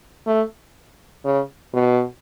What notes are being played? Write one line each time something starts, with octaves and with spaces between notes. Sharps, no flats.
A3
C#3
B2